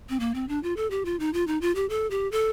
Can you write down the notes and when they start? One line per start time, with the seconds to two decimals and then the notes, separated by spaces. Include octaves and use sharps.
0.09 C4
0.20 A#3
0.35 C4
0.49 D4
0.63 F4
0.77 A4
0.91 G4
1.05 F4
1.20 D#4
1.33 F4
1.47 D#4
1.61 F4
1.75 G4
1.90 A4
2.11 G4
2.32 A4